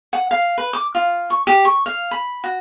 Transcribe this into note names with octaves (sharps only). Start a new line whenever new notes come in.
F#5
F5
B4
D6
F4
C#6
G4
C#6
F5
B5
F#4